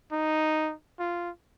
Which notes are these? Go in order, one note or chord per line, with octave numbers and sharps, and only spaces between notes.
D#4
F4